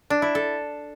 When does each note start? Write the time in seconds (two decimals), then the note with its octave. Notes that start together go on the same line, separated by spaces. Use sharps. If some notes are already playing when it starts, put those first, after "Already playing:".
0.10 D4
0.22 E4
0.35 A4